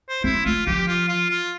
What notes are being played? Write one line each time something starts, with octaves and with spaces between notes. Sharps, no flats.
C5
C4 E4
A3 F4
F3 G4
F4
F4
F4